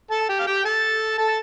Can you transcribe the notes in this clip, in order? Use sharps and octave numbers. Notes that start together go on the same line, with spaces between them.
A4 A5
G4 G5
F5
G4 G5
A4 A5
A4 A5